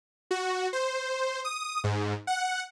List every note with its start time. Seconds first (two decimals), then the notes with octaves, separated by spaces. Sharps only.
0.31 F#4
0.73 C5
1.44 D#6
1.84 G#2
2.27 F#5